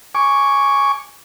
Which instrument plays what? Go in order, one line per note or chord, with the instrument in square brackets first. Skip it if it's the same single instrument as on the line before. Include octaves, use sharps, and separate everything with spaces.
[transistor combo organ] G#5 C#6 D6